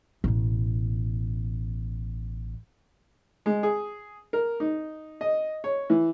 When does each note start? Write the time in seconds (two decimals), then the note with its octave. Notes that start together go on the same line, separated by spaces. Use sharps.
0.24 A1 B2
3.46 G#3
3.63 G#4
4.33 A#4
4.60 D#4
5.21 D#5
5.64 C#5
5.90 E3